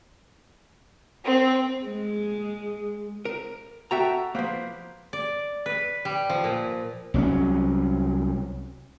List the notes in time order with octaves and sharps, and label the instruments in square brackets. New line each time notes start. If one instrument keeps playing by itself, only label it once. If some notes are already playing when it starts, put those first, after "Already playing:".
[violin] C4
[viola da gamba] G#3
[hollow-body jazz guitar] A#4
[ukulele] F#4 A4 F#5 [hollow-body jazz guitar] E5 G5 A#5
[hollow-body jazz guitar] F3 A#3 [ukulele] B4 C5
[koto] D5
B4
G3
F3
A#2
[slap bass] C2 F#3 G#3 C#4